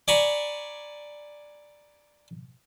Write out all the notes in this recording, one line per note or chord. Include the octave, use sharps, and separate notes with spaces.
D5 G#5 A#5 B5 C#6